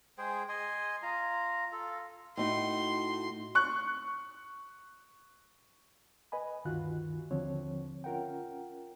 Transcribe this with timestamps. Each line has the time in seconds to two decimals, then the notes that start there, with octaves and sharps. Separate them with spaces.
0.18 G#3 G#4 C5 G5
0.49 D#5 G#5 C6
1.03 F4 A#5
1.72 F4 A4
2.37 A2 D#4 F#4 C6
3.55 C#6 F#6
6.32 B4 D#5 G#5 B5
6.65 D2 G2 D#3 F4 F#4 F#6
7.31 D#2 D3 F3 C4 C#5
8.04 C#4 F4 A#4 F#5 G5